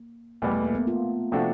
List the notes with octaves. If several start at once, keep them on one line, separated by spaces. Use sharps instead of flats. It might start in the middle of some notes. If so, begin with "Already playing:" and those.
Already playing: A#3
E2 B2 G3 A3 B3
A3
A#3
B3
F4
C3 F3 A3 D4 F#4